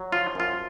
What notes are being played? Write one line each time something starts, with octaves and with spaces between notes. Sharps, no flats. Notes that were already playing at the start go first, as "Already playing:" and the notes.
Already playing: F#3
F3 F4
F#2 F4